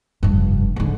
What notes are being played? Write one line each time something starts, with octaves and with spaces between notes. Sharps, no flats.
F1 G2
G#2 D3